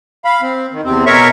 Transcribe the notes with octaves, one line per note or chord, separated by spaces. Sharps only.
F5 B5
C4
D#3
E2 C3 C4
B2 A#4 C#5 E5 C#6